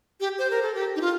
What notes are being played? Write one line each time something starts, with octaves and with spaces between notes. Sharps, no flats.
G4
C5
A#4
A4
G4
D#4
F4